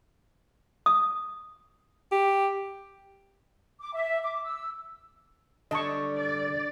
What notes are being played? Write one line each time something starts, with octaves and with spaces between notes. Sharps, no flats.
D#6
G4
D6
E5
D6
E6
D3 G3 D4 D#5 A5 C#6
D5